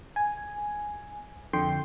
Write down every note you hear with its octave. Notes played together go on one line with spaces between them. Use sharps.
G#5
F2 D3 G5 C6